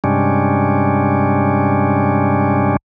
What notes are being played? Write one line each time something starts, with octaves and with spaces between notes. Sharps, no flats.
G2 C3 G3 G#3 C#4 D4